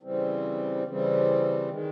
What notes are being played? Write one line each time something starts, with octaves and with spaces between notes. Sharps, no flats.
C#3 E3 G3 C4
C#3 E3 G3 C4
D#3 G#3